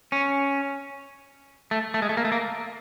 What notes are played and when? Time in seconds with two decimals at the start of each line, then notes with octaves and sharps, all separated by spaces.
0.12 C#4
1.71 A3
1.94 A3
2.02 G#3
2.09 A3
2.17 A#3
2.25 A3
2.32 A#3